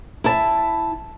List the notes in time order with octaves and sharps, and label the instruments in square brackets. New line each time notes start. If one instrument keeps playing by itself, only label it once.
[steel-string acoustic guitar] E4 A5